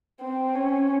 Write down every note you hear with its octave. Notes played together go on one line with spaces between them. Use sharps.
C4
C#4